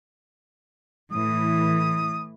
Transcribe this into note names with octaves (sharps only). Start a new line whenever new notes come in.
A2 E3 D#6